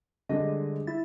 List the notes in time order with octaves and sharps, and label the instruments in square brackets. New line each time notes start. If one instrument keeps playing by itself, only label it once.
[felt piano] D3 G#3 [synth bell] G3 G4 D#5
[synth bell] E4 E5 A6